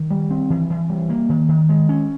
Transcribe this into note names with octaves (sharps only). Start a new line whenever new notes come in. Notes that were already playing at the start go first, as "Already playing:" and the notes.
Already playing: D#3
G3
C4
E3
E3
G3
A#3
D#3
D#3
G#3
C#4